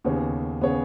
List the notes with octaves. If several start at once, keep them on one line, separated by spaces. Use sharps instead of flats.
D#2 C#3 B3 G#4 C#5
C#3 B3 G#4 C#5